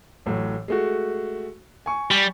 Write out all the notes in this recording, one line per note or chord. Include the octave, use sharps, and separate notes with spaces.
A1 A2 F#3
G#3 A3 F#4
G#5 C#6
G3